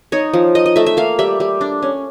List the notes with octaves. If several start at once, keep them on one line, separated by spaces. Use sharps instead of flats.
D#4 C#5
F3
D#4 D#5
D#5
A3 E5
E5
A#3 F5
G3 E5
G3
D4
C#4